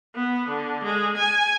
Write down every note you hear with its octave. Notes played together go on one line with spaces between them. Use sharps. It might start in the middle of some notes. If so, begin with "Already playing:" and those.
B3
D3
G#3
G#5